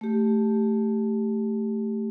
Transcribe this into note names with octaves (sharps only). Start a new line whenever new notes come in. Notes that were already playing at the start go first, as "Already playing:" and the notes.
A3 G4